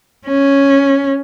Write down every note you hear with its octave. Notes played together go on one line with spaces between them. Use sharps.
C#4